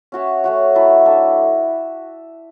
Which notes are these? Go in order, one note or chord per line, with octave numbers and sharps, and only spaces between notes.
C#4 F#4 C#5 E5
A3 C#4 F#4 C#5
F#3 A3 E4 A4
D4 A4 E5